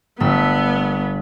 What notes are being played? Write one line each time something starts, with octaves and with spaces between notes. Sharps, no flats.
G1 A3 B3 E6